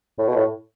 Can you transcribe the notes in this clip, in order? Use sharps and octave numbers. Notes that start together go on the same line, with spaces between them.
A2
B2
A2